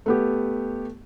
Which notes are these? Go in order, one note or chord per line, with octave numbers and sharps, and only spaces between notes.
A3 B3 G4